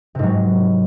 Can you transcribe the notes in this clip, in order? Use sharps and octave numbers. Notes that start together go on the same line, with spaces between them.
G#2 C3 F#3